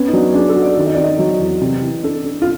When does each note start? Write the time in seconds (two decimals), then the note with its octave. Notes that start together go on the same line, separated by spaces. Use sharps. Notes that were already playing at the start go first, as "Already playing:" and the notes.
Already playing: B3 C#4
0.08 D#4
0.13 F#3 D4
0.34 D4 G#4
0.49 A4
0.56 F#4
0.63 D5
0.77 D#3
0.86 D#5
0.94 D#3 D5
1.04 D#5
1.19 F#3
1.40 E2
1.62 C3
1.82 E3
2.03 D4 A4
2.24 D4
2.42 F4